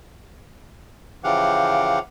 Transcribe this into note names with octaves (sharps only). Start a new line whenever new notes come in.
C#3 E3 F3 G4 F5 F#5